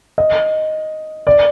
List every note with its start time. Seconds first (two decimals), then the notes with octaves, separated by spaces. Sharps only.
0.18 D#5
1.27 D5